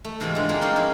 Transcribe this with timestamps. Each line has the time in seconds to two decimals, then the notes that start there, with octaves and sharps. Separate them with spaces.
0.05 A3
0.20 G#2 C3 E3 G#3 C4 F4
0.35 D3 G#3
0.49 F3 G3 G#3 A#3 G4 G#4
0.61 C4 C#4 D#4 F4 C6
0.76 C#4 D#4 E4